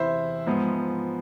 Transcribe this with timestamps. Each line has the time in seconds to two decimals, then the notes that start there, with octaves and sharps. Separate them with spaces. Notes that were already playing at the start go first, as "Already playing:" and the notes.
Already playing: E2 C3 E3 E4 C5 E5
0.46 G#2 F3 B3